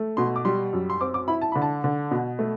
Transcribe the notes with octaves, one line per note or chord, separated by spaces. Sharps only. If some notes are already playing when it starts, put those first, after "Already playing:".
Already playing: A3
B2 C6
D6
G3 C6
F#2
C6
C4 D6
D6
E4 B5
A5
D3 B5
A5
D3
B2
A3